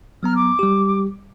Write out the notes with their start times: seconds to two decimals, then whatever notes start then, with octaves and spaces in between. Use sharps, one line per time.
0.23 F#3 B3 A#5 F6
0.35 D6
0.59 G3 G4